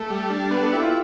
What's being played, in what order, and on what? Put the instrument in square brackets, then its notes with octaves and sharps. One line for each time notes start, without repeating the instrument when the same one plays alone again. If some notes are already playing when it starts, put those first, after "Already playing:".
Already playing: [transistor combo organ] A3 [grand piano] A4
[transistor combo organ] G3
D4
[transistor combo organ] B3 [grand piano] B4
[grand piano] A4
[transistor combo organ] E4 [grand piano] G4
[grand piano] F4